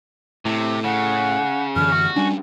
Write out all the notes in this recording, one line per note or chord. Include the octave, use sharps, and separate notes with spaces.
A2 C3
C#3 F#5
F#2 D3 E3 F6
F#4
G3 C#4 D4 G#5